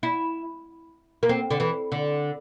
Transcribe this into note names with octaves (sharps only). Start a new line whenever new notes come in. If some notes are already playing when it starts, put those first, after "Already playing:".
E4
A#3
C4
D3
E3
D3